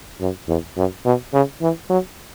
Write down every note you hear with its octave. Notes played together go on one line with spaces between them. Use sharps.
F#2
E2
F#2
B2
C#3
E3
F#3